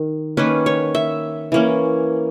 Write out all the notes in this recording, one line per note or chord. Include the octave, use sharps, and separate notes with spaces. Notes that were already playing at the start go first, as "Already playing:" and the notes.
Already playing: D#3
D#3 A#3 C#4 B4
C#5
E5
E3 A#3 C#4